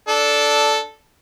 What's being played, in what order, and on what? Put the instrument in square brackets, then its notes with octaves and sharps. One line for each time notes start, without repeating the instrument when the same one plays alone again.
[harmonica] D4 A4